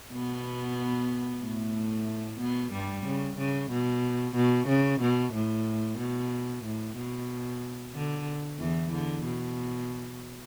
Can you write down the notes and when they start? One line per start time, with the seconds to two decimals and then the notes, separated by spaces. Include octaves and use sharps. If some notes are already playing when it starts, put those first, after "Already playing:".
0.12 B2 B3
1.43 A2 A3
2.40 B2 B3
2.72 G2 G3
3.06 C#3
3.38 C#3
3.71 B2
4.36 B2
4.68 C#3
5.01 B2
5.34 A2
5.99 B2
6.65 A2
6.97 B2
7.94 D3
8.59 E2 E3
8.93 D3
9.25 B2